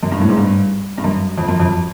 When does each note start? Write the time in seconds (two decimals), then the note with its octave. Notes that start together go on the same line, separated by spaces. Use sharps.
0.03 F#2
0.12 G2
0.20 A2
0.29 G#2
0.37 G2
0.98 G2
1.04 F#2
1.38 F2
1.48 F#2
1.60 F2